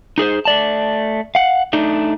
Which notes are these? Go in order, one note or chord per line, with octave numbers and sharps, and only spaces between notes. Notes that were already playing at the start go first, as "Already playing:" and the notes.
D#4 G#4 A4 C5
A3 D5 A5
F5 F#5
A3 D4 D#4